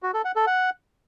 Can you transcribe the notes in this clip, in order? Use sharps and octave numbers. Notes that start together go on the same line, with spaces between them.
F#4
A4
F#5
A4
F#5